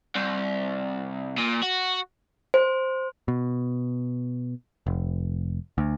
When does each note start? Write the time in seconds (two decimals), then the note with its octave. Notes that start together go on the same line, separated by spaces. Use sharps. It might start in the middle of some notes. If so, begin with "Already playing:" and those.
0.15 C2
1.38 A#2
1.63 F#4
2.54 C5
3.28 B2
4.86 F1
5.78 D2